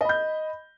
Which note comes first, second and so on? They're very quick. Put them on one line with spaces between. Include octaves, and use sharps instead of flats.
D#5 B5 G6